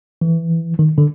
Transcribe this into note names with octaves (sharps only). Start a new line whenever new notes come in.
E3
D#3
D3